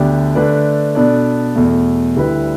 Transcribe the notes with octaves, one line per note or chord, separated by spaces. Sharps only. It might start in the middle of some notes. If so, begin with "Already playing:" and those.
Already playing: D2 D3 B3 D4 G4
D3 A3 D4 B4 D5
B2 B3 D4 A4 D5
E2 B2 A3
D2 D3 G3 E4 B4